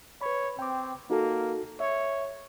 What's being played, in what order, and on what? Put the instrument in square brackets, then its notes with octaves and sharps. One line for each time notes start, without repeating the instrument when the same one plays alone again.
[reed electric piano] B4 B5 [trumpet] C#5
[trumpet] C4 [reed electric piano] G5 D6
[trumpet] A#3 [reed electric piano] D#4 F#4 A4
[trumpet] C#5 [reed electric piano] E5